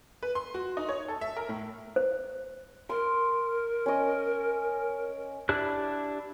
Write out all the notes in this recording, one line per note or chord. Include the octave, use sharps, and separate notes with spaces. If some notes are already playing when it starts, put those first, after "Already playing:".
B4
C6
F#4
D#4
C#5
A4
E5
A#4
A2
C5
A#4 C6
C#4 D#5
D4 E4 G4 F#6